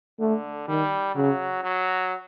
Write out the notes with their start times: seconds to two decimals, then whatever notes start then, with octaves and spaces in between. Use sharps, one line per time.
0.20 D3 A3
0.68 D#3 G3
1.15 C#3 F#3
1.63 F#3